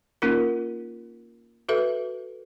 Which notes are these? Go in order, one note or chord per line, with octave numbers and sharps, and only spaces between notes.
A#3 C#4 D#4 F4 A#4
F#4 A4 B4 E5